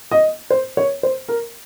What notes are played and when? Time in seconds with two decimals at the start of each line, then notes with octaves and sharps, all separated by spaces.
0.11 D#5
0.50 C5
0.77 C#5
1.03 C5
1.28 A#4